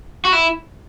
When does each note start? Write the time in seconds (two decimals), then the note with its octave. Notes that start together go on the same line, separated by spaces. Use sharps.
0.25 F#4
0.33 E4